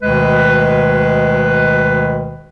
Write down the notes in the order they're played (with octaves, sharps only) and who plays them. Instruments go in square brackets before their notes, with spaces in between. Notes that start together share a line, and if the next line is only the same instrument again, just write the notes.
[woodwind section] D2 B2 D#3 G#3 B4